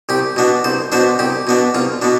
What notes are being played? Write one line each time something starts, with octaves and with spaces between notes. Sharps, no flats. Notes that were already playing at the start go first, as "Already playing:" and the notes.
C2 G4
B2 B3 D4
C2 C5
B2 B3 D4 C5
C2 G4
B2 B3 D4
C2 F4
B2 B3 D4